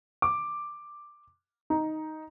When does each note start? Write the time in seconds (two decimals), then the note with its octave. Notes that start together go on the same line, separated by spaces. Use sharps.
0.22 D6
1.70 D#4